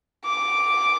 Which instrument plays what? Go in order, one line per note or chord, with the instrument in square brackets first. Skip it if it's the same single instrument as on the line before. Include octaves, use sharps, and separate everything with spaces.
[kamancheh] D6